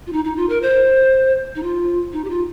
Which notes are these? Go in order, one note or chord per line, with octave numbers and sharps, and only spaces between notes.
F4
D#4
D#4
F4
A#4
C5
D#4
F4
D#4
G4
F4